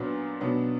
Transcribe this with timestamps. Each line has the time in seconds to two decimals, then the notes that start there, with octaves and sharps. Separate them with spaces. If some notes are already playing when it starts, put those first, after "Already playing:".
Already playing: A#2 F#3 B3 D4
0.40 B2 F#3 B3 D4